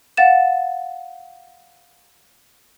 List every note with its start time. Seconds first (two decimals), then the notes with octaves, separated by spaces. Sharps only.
0.17 F5 F#5 A6 E7